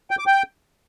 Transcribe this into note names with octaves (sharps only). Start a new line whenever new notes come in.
G5
D6
G5